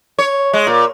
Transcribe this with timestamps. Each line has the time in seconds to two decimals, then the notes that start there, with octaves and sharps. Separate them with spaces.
0.18 C#5
0.53 G#3
0.67 A#2